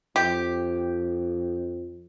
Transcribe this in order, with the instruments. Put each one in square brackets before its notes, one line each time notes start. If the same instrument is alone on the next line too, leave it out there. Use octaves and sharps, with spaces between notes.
[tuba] F2 [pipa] G4